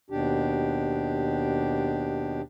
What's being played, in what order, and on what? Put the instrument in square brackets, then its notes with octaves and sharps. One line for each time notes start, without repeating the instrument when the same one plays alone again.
[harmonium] D#2 B2 D4 G4